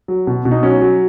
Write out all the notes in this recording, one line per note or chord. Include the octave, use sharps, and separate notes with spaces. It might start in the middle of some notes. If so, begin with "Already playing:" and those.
F#3
B2
B2
D#4
F#3 C#4
F#3